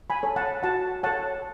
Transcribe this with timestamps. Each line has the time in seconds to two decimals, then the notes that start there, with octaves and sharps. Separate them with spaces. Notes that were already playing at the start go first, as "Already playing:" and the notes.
0.10 G#5 B5
0.23 A4 C#5
0.36 F#5 A5
0.63 F#4 F#5 A5
1.03 A4 C#5 F#5 A5